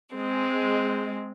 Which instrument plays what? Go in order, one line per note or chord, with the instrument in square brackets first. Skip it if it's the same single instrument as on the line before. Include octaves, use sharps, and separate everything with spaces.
[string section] G#3 [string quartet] C4